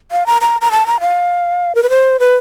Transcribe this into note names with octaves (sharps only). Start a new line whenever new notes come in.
F5
A#5
A#5
A#5
A5
A#5
F5
A#4
B4
C5
B4